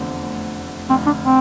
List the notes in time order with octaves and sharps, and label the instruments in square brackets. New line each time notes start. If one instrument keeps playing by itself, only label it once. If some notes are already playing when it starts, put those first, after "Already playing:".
Already playing: [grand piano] F1 E2 D3 A3 C4
[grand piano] F1 F2 D3 [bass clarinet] C4
[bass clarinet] D4
C4